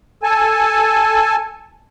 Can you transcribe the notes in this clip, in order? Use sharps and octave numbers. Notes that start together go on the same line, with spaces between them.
A4 G#5 A5